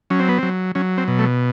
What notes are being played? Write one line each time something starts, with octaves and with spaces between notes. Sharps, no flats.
F#3 C#4
C4
B3
F#3 C4
F#3 C#4
C4
B2
A3